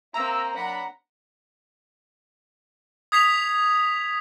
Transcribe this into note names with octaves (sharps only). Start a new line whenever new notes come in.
A#3 C4 E5 A#5 E6
F#3 D4 F#5 B5
D#6 G#6 B6 C7 F7